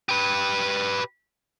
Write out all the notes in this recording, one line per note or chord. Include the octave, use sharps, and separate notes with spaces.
G4 B4